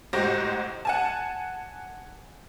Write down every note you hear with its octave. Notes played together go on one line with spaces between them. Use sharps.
A1 G#2 F#4 G4 C5 A#6
F#5 G#5 A5